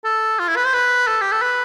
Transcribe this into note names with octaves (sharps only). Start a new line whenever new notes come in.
A4
F4
E4
B4
C5
B4
A4
G4
A4
B4